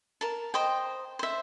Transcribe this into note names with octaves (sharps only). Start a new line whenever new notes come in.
A#4 A5
C5 D#5 G5
C5 E5